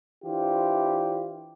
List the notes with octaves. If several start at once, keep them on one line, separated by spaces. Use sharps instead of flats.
E3 D4 F4 G4 C5